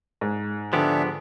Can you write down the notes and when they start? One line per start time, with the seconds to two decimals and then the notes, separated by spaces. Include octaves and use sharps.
0.21 G#2
0.73 D3 F3 B3 D4 G4 G#4 E5